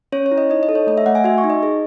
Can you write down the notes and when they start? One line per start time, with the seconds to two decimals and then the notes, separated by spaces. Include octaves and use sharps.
0.12 C#4 C#5
0.26 C#5
0.31 E4
0.38 D#5
0.50 D#4 D#5
0.63 D#5
0.69 A4
0.75 C#5
0.87 A3 D#5
0.97 E5
1.06 A3 F#5
1.15 G#5
1.24 F#4 E5
1.38 C#6
1.44 D#4
1.50 D#5
1.63 G#4